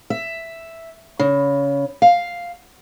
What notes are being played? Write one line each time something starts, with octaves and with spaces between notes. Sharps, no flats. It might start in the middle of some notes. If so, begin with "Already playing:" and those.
E5
C#3
F5